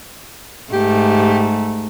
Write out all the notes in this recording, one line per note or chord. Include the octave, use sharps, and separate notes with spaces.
G#2 A3 G4